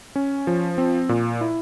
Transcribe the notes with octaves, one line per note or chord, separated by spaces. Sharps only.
C#4
F3
C4
A#2
E4